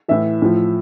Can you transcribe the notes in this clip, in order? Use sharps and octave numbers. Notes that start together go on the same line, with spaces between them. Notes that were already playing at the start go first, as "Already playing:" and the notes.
A2 E3 E5
A2 F3